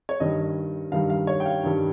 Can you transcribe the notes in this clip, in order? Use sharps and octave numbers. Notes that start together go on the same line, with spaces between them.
C#5
G2 D#3 G3 D#5
G2 D#3 G3 F5
F5
C#5
G5
F5
G2 D#3 G3